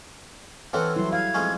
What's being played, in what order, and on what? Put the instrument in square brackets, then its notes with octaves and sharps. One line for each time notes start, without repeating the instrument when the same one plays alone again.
[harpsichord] E3 C4 [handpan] A4 C#5 F#5 [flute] F6
[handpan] F#3 G3 E4 [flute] C6
[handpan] F5 [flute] G#6
[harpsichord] F2 G#3 C#4